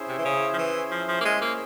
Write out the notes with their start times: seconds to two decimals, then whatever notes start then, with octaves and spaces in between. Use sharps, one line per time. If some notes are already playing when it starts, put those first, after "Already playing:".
Already playing: C#4 E4 G#4 C5 E5
0.08 C3
0.19 E3
0.25 C#3
0.54 F3
0.58 E3
0.91 F3
1.08 F3
1.21 A#3
1.25 G#3
1.42 A#3